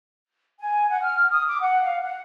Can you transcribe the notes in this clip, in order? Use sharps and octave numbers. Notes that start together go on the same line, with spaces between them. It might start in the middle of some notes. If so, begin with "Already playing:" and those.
G#5
F#5
F6
D#6
D6
F#5
F5
F#5